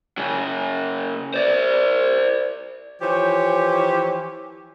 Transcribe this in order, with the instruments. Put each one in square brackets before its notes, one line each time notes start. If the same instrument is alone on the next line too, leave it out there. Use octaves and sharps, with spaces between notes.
[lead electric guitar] C#3 F#3
C5 D5
[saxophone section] E3 F3 G4 C5 C#5